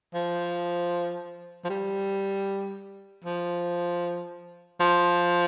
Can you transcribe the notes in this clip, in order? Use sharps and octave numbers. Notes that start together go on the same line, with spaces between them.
F3
F3
G3
F3
F3